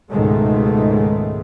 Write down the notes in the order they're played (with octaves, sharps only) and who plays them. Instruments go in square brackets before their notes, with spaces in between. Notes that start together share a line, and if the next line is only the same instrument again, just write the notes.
[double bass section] C#2 G#2 B2 D#3 G#3 A3